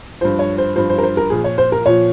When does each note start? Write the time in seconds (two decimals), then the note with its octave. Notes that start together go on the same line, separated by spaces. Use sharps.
0.21 G2 F3 C5
0.39 C#5
0.58 C5
0.76 G2 F3 C5
0.89 C5
0.98 A#4
1.03 C5
1.17 A#4
1.30 A#2 F3 G#4
1.44 C#5
1.58 C5
1.72 A#4
1.86 A#2 F3 C#5